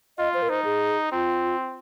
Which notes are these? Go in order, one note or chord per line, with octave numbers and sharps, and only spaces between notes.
F4 D#5
C5
A#4
D#4 C5
G#4
C4 F4